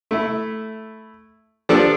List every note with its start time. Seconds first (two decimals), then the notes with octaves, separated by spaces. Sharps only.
0.11 A3 E4
1.69 F3 G3 D4 A4